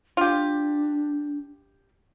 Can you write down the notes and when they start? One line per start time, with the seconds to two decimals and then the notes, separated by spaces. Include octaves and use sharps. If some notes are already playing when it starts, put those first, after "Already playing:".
0.17 D4 F4 G4